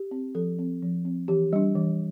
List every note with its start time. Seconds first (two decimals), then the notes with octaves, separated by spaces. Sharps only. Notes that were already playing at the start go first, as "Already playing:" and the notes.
Already playing: G4
0.11 C4
0.35 F3 A4
0.59 C4
0.82 F3
1.05 C4
1.28 E3 G4
1.53 G3 D4
1.75 E3